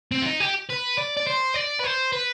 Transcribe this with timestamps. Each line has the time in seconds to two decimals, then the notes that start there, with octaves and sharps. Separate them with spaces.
0.11 C4
0.22 F4
0.26 D#4
0.40 G4
0.69 B4
0.98 D5
1.17 D5
1.27 C5
1.55 D5
1.80 B4
1.85 C5
2.12 B4